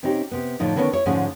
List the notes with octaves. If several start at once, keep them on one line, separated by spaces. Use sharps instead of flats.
C3 C4 C#4 D#4 G4
C3 B3
A2 D3 F3 D#4
D3 D#3 B3 C#4 A4 C#5
E4 C#5
G#2 D3 F3 A3 C#4 G#4